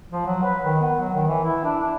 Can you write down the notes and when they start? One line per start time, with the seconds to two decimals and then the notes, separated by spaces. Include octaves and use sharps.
0.12 F3
0.26 F#3
0.43 B4
0.65 D#3
0.81 B3
0.99 F#3
1.15 D#3
1.27 E3
1.44 E4
1.64 D4
1.81 D4